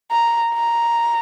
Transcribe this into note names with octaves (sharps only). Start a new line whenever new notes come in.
A#5
A#5